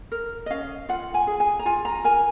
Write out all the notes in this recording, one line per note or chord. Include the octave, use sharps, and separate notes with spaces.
A#4
D#5
C#4 F5
F4 F#5
G#5
G#4
G#5
A#5
F4 G#5
A#5
A#4 G#5